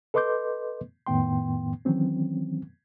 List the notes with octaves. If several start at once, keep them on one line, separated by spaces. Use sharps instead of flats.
A4 B4 D#5 C6 D6 G6
F2 A2 D#3 B3 G5 C6
D#3 E3 F#3 C4 C#4